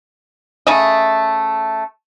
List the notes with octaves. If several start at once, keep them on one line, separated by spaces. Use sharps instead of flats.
C#3 A3 D#5